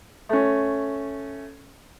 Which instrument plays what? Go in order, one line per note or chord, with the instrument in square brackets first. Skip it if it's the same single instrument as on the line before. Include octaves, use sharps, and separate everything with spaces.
[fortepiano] A3 C#4